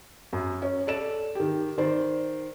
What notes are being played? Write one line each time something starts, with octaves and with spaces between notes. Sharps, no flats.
F#2
C#4
A4 D5 E7
D#3 G4
D#3 C5 D5